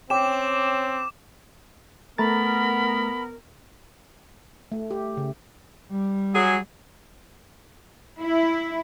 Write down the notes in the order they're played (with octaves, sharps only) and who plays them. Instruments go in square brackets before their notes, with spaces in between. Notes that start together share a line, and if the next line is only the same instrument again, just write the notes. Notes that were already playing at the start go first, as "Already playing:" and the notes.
[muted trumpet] C4 [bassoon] C#4 [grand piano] G5 [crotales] D6 E7
[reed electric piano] A3 A#5 A6 [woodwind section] B3 A#4 [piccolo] B5
[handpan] A3
G4
C#3
[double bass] G3
[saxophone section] F#3 G#4
[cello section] E4